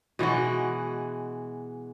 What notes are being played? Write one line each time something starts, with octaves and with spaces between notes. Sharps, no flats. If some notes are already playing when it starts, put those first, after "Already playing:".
B2 E3 G#3 F#4